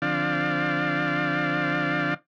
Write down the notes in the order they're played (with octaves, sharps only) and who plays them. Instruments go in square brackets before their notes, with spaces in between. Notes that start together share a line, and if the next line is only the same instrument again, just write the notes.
[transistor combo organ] D3 F3 C4 D4 D5 F5